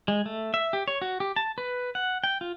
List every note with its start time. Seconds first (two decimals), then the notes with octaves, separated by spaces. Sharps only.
0.08 G#3
0.26 A3
0.54 E5
0.73 G4
0.88 C#5
1.02 F#4
1.20 G4
1.36 A5
1.58 B4
1.95 F#5
2.24 G5
2.41 F4